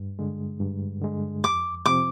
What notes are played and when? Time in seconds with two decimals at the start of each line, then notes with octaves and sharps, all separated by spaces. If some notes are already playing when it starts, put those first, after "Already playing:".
Already playing: G2
0.19 D3 G#3
0.60 G2
1.02 D3 G#3
1.44 F2 D6
1.86 C3 F3 C4 D6